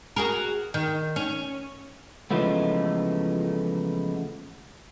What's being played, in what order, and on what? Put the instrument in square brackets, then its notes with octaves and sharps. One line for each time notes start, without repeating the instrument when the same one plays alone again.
[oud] F#4 G#4 A#4
D#3
C#4
[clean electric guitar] C#3 E3 F3 G#3 A3 B3